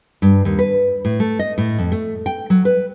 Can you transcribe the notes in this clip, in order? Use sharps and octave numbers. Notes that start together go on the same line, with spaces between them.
G2
D#2
B4
A2
A3
D#5
A2
F2
A3
G5
F#3
B4